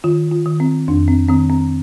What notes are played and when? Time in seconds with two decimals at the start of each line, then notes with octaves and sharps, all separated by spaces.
0.04 D#3 F4
0.31 F4
0.46 D#3
0.60 C4
0.88 F2 D4
1.08 C4
1.29 D#3 C4
1.50 C4